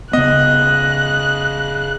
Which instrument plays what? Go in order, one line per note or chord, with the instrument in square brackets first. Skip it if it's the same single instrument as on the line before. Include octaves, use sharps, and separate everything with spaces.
[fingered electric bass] C#3 B3 [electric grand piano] D#5 [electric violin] F#6